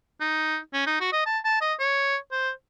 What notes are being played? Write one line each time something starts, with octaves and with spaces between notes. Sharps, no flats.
D#4
C#4
D#4
F#4
D#5
A5
A5
D#5
C#5
C5